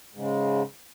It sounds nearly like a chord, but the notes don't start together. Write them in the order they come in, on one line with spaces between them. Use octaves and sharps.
G#2 C#3 G#3